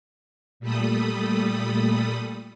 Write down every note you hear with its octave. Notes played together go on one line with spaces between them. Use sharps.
A#2 G3 A3 A4 B5 D#6